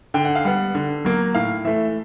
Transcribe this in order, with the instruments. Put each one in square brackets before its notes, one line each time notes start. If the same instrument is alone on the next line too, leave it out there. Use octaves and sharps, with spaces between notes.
[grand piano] D3 G5
F#5
F5
G3 B3 F#5
D3
F#3 A#3
A2 F5
E3 A3 E5